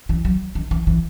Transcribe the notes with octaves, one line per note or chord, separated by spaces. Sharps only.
E3
F#3
D#3
E3
E3